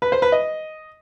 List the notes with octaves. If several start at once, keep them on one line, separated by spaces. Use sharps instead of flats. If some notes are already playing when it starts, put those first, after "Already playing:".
B4
C5
B4
D#5